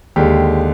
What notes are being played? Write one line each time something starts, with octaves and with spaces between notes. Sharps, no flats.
D#2 D3 G#3 G4